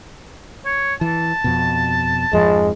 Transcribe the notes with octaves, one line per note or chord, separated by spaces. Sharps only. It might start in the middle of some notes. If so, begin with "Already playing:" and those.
C#5
E3 A5
F2 B2
F2 G#2 F3 G#3